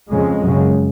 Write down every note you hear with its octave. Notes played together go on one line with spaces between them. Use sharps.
F2 C#3 G#3
F#2 C#3